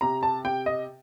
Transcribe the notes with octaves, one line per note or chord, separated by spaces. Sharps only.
C3 A#5
A5
C3 G5
D#5